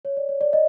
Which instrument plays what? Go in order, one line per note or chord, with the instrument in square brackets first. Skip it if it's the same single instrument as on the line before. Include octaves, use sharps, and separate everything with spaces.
[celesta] C#5
D5
C#5
D5
D#5